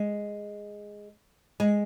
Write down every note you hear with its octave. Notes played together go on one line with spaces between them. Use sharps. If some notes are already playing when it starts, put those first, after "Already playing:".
Already playing: G#3
G#3